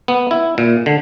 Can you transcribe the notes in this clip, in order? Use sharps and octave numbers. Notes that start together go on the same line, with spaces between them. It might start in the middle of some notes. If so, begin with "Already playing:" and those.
B3
E4
A#2
D3